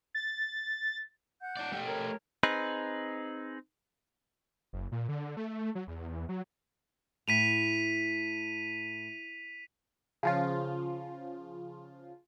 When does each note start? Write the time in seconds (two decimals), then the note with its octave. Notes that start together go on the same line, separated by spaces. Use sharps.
0.15 A6
1.40 F#5 G6
1.57 D#4 D5
1.72 A3 G4
1.86 A#4 C#5
2.43 C4 D#4 G#4 B4
4.73 F#1
4.92 A#2
5.09 D3
5.37 A3
5.75 F#3
5.87 E2
6.29 F#3
7.28 A2 B6 D#7 F7
10.23 C#3 F3 F4